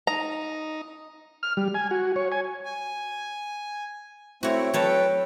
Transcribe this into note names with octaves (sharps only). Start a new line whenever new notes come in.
D#4 A#5
F6
G3
G#5
F#4
C#5
G#5
G#5
A3 C4 E4 F#4 C#5
F#3 A4 B4 C#5 G5 A5